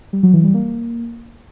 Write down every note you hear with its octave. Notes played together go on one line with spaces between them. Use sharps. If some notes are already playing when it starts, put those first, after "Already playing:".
G3
F#3
E3
G3
A#3